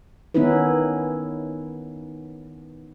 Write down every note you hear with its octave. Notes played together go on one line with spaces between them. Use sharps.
D#3 B3 C#4 D#4 E4 B4